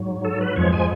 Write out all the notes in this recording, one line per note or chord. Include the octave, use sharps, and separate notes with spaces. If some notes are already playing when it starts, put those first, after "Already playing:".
Already playing: G#2 F#3
A4
B4
F2 F3 G#3 C#5
G#5